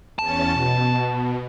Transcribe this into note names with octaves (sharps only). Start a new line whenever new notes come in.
E2 C#4 A5 A6
B2